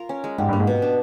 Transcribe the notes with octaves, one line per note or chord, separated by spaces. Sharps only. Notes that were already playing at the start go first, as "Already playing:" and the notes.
Already playing: F4 A#4
C#4
G#3
G#2 G3
G2
A#3
G#2
B2
D4